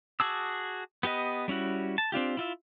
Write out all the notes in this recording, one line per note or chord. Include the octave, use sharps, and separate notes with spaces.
F#4 G#4 A5 D6 E6
B3 G4 B4 D#5
G3 C#4 E4 F#4
A5
C4 D4 F4 G4
E4 F4 E5